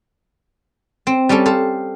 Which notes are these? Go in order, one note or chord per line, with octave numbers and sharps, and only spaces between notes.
C4
G3 C#4 G4 A4
A4 C5 F5